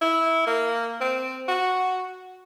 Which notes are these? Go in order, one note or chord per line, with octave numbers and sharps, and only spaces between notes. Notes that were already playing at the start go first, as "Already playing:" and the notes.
E4
A#3
C4
F#4